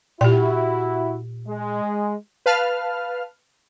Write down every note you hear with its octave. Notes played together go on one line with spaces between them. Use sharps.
A#2 E4 F#4 G4 G5
G#3
B4 F5 A5 F6